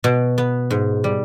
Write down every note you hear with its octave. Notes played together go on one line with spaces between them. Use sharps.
B2
B3
G#2
G3